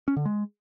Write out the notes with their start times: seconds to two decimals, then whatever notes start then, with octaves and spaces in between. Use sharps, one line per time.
0.08 C#4
0.17 D3
0.25 G#3